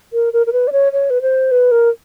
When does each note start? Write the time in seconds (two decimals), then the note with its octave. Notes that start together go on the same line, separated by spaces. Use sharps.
0.13 A#4
0.33 A#4
0.46 A#4
0.53 B4
0.67 D5
0.72 C#5
0.92 C#5
1.10 B4
1.22 C5
1.51 B4
1.71 A#4